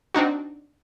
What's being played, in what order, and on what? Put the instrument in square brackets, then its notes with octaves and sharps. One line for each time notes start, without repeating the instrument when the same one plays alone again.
[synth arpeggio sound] C4 D4 D#4 F#4